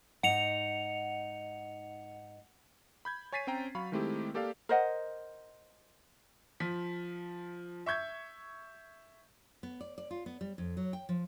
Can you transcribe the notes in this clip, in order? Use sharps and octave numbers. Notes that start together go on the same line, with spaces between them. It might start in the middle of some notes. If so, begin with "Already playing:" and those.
G#2 D#4 F#5 C#7 F7
B5 G6 G#6
C#5 G#5 A6 B6 C7 D#7
C4 C#4 G5 A#5
F#3 F5 B5 C#6
D#3 G#3 A3 C4 E4 G4
A#3 G4 A4 D5 F5
A#4 C5 D#5 F#5
F3 B6
E5 C#6 G6 G#6
B3
D5
D5
F4
B3
G3
F2
F#3
G5
F3